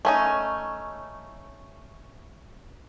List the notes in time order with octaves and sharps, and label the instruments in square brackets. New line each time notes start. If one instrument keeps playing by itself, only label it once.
[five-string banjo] A3 C#4 D#4